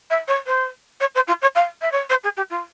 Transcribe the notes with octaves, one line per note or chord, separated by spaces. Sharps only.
E5
C#5
C5
C#5
C5
F4
C#5
F5
E5
C#5
C5
G#4
G4
F4